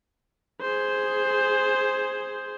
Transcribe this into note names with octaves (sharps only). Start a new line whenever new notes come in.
G#4 C5